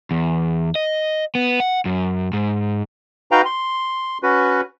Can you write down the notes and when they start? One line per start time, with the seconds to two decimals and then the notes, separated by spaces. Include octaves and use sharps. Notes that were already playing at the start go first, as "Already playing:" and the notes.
0.11 E2
0.75 D#5
1.35 B3
1.60 F#5
1.85 F#2
2.33 G#2
3.31 D#4 F#4 B4 F5 G5 A#5
3.45 C6
4.23 C#4 F#4 B4